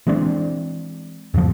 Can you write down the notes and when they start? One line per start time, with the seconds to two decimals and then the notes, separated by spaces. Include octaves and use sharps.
0.07 E3 G#3 C4 D4
1.34 E2 G#2 C#3 F3